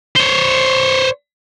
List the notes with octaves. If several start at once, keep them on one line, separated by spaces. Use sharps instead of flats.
C5 C#5